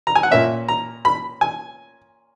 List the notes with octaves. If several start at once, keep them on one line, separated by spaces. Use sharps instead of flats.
A#5
G#5
F#5
A#2 A#3 C#4 E5
A#5
B5
G#5